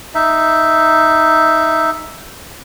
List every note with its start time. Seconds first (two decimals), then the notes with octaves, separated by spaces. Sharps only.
0.15 D#4 E5